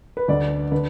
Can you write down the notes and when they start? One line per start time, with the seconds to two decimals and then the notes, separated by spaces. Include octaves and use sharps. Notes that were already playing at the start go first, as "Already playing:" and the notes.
0.17 B4
0.28 D2 D3 D5
0.72 D3 B4